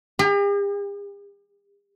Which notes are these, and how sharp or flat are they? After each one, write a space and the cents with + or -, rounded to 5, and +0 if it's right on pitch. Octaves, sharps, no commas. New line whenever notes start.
G4 +45 A#5 +0